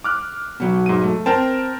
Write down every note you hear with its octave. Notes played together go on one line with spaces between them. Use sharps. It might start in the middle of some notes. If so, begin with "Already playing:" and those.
D6 F6 F#6
B2 F#3
G#2 D#7
A3
C4 A#4 G5 A5